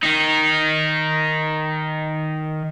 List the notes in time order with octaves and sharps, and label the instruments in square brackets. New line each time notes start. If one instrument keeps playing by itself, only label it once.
[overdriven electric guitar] D#3 D#4